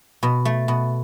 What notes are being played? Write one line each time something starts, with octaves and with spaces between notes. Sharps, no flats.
B2
A3
B2